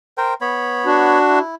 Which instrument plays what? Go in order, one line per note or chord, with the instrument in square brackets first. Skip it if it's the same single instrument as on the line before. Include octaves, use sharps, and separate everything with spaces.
[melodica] A#4 C5 G5
B3 C#5 B5
[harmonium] D4 F#4
[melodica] E4